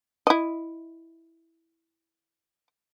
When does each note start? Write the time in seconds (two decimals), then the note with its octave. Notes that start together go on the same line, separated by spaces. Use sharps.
0.27 E4 D#5